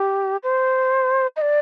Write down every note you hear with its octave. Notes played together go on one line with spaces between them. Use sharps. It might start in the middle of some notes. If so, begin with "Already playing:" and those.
Already playing: G4
C5
D#5
D5